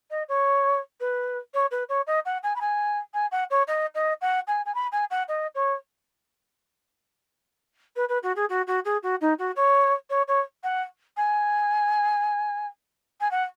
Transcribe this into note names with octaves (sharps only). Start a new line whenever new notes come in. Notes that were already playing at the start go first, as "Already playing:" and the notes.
D#5
C#5
B4
C#5
B4
C#5
D#5
F#5
G#5
B5
G#5
G#5
F#5
C#5
D#5
D#5
F#5
G#5
G#5
B5
G#5
F#5
D#5
C#5
B4
B4
F#4
G#4
F#4
F#4
G#4
F#4
D#4
F#4
C#5
C#5
C#5
F#5
G#5
G#5
F#5